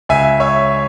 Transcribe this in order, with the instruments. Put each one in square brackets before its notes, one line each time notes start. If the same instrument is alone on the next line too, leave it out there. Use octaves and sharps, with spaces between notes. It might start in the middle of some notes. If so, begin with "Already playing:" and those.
[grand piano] C#2 E5 G#5
C#5 E5